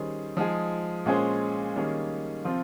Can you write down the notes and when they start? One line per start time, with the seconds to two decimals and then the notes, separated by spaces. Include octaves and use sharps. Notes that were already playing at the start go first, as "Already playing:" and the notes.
Already playing: D#3 G3 C#4 G#4 C5
0.37 F3 G#3 D#4 G#4
1.06 A#2 G#3 C#4 G#4 C5
1.76 D#3 G3 A#3 C#4 G#4
2.45 C3 F3 C4 F4